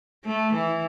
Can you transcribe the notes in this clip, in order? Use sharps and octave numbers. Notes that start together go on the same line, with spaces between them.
A3
E3